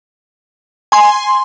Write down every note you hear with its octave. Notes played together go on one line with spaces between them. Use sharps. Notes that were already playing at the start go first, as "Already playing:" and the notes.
G#5 C6